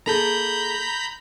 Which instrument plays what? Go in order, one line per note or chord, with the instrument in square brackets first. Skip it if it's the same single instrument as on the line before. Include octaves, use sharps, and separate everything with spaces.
[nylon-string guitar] A#3 G#4 A4 [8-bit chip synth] A#5 B5 G6